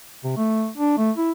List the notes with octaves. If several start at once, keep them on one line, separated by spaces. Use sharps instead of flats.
C3
A3
D4
A3
E4